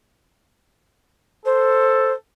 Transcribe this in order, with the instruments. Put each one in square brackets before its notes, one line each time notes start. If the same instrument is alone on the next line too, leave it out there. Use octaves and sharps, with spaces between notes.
[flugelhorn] A4 [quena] C5